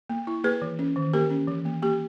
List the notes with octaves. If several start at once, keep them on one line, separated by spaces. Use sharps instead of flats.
A#3
E4
A#3 G#4 B4
E3
C#4
D#3
A#3 G4 A#4
C#4
E3
A#3
A#3 G4